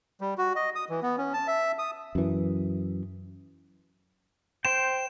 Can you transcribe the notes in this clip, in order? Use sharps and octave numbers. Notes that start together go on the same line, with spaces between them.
G3
F#4
D#5
D#6
E3
B3
C#4
A5
E5
D#6
F#2 E3
C5 G5 E7